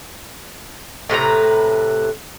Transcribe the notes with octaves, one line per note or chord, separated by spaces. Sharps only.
A2 C3 B4 A#5